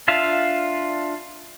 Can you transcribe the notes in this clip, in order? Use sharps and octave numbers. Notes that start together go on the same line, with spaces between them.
D4 F4 E5 F5